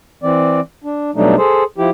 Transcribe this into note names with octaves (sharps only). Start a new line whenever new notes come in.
E3 C4 D5
D4
B2 F#3 G3 A3 D4 D#4
G#4 A4 C5
F3 E4 G4